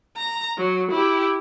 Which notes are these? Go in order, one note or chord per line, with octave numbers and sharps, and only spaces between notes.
A#5
F#3
E4 G4